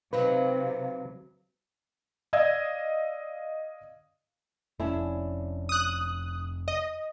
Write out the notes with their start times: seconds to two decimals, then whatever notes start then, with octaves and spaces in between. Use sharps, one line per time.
0.13 C3 F#3 C4 D#4 B4 F5
2.33 D5 D#5 F5 E6 G#6
4.80 F1 C#4 D4 E4
5.69 D#6 F#6
6.68 D#5